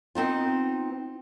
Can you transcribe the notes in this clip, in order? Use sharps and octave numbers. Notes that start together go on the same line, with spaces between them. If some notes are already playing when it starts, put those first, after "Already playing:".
B3 C4 D#4 F4